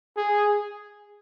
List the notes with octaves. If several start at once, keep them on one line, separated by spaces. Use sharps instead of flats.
G#4